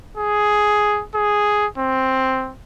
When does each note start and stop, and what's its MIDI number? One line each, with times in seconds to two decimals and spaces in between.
0.17 1.02 68
1.15 1.66 68
1.78 2.53 60